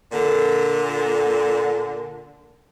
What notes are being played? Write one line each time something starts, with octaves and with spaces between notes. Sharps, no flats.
A#2 D3